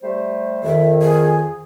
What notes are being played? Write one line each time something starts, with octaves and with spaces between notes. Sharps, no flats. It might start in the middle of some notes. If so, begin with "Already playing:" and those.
G3 A3 C5
F2 D#3 E5
G#4